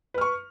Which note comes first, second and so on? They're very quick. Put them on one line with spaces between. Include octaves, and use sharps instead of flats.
B4 F6 C#6